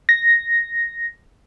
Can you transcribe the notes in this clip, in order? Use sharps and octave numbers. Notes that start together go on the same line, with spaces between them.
A#6